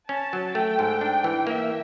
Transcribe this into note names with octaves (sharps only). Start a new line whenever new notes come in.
C#4 A5
F#3
A3 G5
G#2
D4
E3
A#3 E5